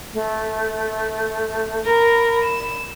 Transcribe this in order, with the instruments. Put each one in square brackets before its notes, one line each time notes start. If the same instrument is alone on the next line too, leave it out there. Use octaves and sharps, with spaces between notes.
[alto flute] A3
[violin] A#4 [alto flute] B5
[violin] E7